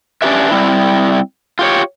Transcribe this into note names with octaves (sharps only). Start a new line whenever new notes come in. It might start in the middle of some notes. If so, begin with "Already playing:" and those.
C#4 D4 E4 G4 B4 E5
G3 C4 E4
F4 G4 C#5